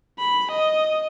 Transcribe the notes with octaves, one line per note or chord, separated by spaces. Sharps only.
B5
D#5